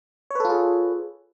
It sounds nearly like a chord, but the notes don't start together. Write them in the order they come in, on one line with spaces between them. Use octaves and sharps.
C#5 B4 A4 F4 G#4